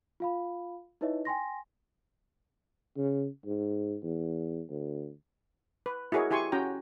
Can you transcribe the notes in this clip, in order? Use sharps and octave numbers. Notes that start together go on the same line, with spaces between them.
F4 F5 B5
D#4 E4 B4 C#5 D#5 E5
G5 G#5 C6 A#6
C#3
G#2
E2
D2
B4
E4 F#4 G#4 A#4 C#5 D#5
E4 G4 G#5 C6 C#6
C#4 F#4 G5 A#5